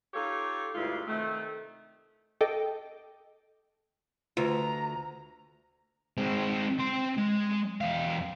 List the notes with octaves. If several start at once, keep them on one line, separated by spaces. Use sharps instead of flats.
D#4 F4 G4 A4 C#5
D2 G2 G#3 E4 F4
C3 D#3 A3
A4 D#5 G5 D6
D2 F4 B4 A#5
G#3 C4
C4 C6
G#3
E2 F5